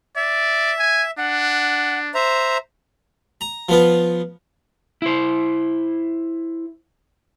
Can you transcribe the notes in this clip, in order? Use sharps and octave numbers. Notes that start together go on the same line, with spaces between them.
D5 E5
G#5
D4 F#5
C5 E5 A#5
A#5
F3 B3 F4
E4 C5